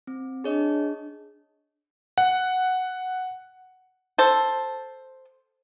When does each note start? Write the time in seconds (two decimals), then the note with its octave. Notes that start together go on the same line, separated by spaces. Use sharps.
0.07 C4
0.44 D4 G#4 C#5 D#5
2.18 F#5
4.18 A4 C5